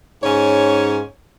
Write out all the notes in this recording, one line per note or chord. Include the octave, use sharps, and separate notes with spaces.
G#2 C#4 C#5